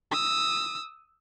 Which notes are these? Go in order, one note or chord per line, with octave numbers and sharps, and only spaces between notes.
D#6 E6